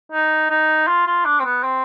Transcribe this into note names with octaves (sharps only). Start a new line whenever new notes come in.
D#4
D#4
F4
F4
D4
C4
B3
C4